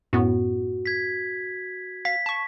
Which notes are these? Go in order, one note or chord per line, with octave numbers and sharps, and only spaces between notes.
F#2 A2 B3 F#4
G#6 B6
F5 B6
A5 C#6